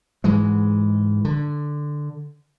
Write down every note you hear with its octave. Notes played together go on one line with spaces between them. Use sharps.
G#2 E3 G#3
D3